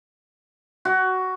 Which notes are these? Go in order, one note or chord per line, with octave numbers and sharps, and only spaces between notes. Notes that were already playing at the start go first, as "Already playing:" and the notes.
F#4